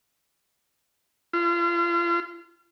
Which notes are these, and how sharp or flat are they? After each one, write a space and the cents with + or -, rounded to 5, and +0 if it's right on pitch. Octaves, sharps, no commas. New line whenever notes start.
F4 -35